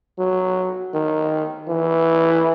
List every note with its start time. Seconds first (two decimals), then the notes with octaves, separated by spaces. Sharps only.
0.19 F#3
0.94 D#3
1.69 E3